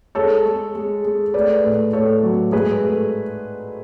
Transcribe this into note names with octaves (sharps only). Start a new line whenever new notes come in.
G#3 A4 C#5
G#3
G#3
G#3
A3 B4 D5
A2
A2 A4 C#5
F#3
G#2 G#4 B4
A3